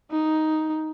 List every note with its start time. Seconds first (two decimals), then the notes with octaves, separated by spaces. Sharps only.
0.11 D#4